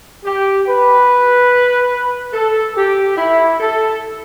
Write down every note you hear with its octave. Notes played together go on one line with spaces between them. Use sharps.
G4
B4
A4
G4
E4
A4